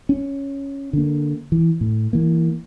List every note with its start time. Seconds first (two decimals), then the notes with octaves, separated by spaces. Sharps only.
0.09 C#4
0.93 D3 A#3
1.52 E3
1.81 A2
2.13 E3 A#3